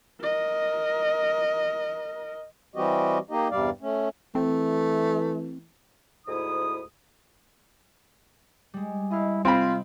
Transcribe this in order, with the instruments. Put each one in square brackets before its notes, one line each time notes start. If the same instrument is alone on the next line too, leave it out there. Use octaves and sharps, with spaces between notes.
[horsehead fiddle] A#4 D#5
[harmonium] E3 G3 C4 F#4 G4 D#5
A#3 D#4 G4 D#5
E2 G2 C3 G3 D5 F5
A3 C#4
[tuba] E3 [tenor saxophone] A3 [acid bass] C4
[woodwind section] D2 G#2 E4 D#6
[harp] G3 G#3
[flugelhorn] E4 [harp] D#5 F5
[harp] C3 [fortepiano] C4 B5 [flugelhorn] F4